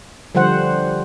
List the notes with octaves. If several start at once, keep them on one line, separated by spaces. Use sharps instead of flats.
D3 F3 G3 C5 F#5